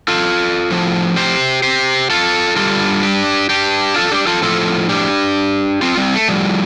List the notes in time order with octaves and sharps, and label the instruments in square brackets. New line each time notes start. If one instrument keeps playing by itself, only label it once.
[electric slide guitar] F4 A4
A2 F3
G4 C5
G4 C5
F4 A4
G2 G3 F4 A4
D4 G4
D4 G4
F4 A4
D4 G4
F4 A4
A2 F3 F4 A4
D4 G4
C4 F4
G3 C4
A3
A2 F3 G3